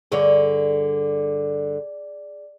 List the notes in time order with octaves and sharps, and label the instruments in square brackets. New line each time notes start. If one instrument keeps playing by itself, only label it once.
[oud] G2 D3 C#5 [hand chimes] G#4 D5